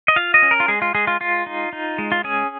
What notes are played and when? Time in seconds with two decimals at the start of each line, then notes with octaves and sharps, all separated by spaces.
0.08 D#5
0.16 F4 F5
0.34 D#5
0.43 C#4
0.51 A#4
0.60 F4
0.68 G#3 G#4
0.82 F4
0.95 G#3 G#4
1.07 F4
1.20 G#3 F4
1.46 D#4
1.73 D#4
1.98 G#3
2.12 F4
2.24 C#4 G#4